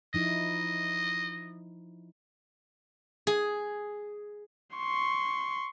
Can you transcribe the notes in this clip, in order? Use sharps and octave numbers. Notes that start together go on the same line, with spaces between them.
F3 D#4 E4 D#5
G#4
C6 C#6